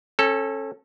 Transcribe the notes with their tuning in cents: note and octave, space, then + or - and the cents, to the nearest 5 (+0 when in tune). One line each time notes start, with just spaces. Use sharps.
C#4 -30 A4 +0